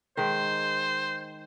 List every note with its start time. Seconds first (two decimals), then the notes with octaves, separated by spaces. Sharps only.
0.17 D#3 G#3 C5